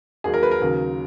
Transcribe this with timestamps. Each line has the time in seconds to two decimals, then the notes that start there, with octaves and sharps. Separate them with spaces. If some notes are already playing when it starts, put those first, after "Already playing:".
0.24 D#2 D#3 F#3 G#4
0.34 A#4
0.43 B4
0.51 A#4
0.61 D#2 C#3 F#3